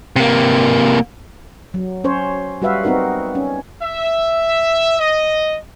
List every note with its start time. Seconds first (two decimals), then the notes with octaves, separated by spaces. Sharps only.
0.16 C3 A#3
1.74 F#3
2.04 C#4 C5 C#5
2.62 G3 F#4 B4 E5 F5
2.84 B3 C4 D#4 F#4 A#4
3.35 C#4
3.83 E5
5.00 D#5